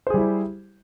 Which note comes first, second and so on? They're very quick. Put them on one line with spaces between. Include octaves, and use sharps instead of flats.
C5 G#4 G3 E4 G4